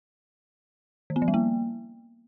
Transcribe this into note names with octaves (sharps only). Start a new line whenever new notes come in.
D#3
B3
F3
G3
A#3